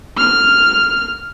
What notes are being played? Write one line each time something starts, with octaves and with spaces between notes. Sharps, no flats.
F6